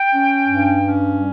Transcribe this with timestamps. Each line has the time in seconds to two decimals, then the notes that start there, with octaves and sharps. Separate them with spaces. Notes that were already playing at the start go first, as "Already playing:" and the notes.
Already playing: G5
0.14 C#4
0.48 G2
0.83 C#4
1.18 G3